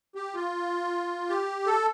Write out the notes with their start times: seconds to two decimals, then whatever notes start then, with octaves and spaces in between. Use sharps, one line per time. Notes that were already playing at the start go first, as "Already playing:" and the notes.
0.15 G4
0.34 F4
1.29 G4
1.67 A4